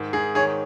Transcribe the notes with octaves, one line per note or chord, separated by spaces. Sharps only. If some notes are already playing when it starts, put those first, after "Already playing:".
Already playing: G#2 D#3
G#2 G#4
D#3 G#4 C#5